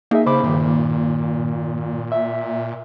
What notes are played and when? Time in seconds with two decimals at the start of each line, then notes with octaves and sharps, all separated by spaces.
0.11 A#3 D#4 G#4 E5
0.26 C#3 C5 B5 D6
0.43 G2 A#2 D#3
2.12 E5